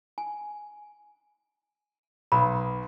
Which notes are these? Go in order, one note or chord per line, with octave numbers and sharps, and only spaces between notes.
G#5
B1 B5